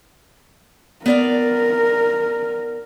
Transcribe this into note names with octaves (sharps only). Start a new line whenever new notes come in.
B3 A#4 D5 F5